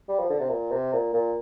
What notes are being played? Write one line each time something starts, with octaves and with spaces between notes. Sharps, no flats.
G3
F3
D3
C3
A#2
C3
A#2
A#2